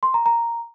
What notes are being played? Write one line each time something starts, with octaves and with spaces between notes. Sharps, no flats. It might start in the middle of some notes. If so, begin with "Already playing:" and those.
C6
A#5
A#5